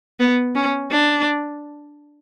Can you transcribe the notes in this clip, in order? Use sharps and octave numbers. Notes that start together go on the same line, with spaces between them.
B3
C#4
D4